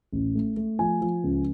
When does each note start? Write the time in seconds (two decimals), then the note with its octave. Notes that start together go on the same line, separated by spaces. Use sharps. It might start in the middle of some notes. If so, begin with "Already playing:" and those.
0.12 A1
0.35 A3
0.57 A3
0.79 F3 G#5
1.01 F3
1.24 C#2